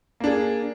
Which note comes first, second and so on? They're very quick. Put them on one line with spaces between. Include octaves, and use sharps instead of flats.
A#3 D4 G#4